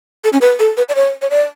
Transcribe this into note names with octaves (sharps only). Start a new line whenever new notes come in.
A4
C#4
B4
A4
B4
D5
C#5
C#5
D5